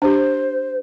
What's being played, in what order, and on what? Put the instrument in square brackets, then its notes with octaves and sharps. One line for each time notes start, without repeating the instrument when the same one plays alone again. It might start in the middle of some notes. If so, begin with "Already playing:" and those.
[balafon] D4 G4 [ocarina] C5